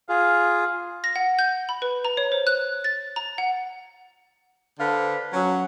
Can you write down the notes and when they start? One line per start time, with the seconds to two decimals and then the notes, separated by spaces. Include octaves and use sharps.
0.09 F4 G#4 F5
1.04 A#6
1.16 F#5
1.39 G6
1.69 B5
1.82 B4
2.05 A#5
2.17 C#5
2.32 C5
2.47 F#6
2.84 A6
3.16 A#5
3.38 F#5
4.79 D3 A4 B4 C5 F5
5.33 F#3 C#4